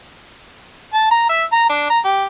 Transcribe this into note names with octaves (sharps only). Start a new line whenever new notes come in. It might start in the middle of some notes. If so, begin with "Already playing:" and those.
A5
A#5
E5
A#5
D4
A#5
G4